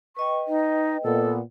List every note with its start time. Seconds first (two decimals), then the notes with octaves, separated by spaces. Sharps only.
0.17 B4 D#5 G5 C#6
0.48 D#4
1.04 A#2 B3 A4